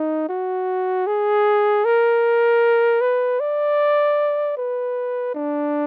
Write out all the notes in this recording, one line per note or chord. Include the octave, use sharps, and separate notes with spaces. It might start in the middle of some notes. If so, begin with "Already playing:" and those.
Already playing: D#4
F#4
G#4
A#4
B4
D5
B4
D4